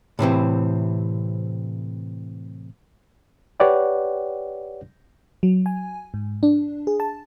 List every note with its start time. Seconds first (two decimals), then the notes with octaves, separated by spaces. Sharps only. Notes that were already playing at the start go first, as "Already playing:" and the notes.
0.19 A2 C3 E3 C4
3.60 G4 B4 C#5 D5 F#5 G5
5.43 F#3
5.66 G#5
6.14 G#2
6.43 D4
6.87 G#4
7.00 A5